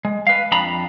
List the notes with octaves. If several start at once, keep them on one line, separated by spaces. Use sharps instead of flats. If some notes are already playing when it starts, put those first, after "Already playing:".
G#3
B4 F5
F2 D4 A#5 B5